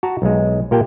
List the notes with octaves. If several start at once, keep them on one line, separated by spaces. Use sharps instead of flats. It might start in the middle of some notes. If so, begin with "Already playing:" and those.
F#4 A5 A#5
B1 G#3
A#2 A#3 G4 G5 A5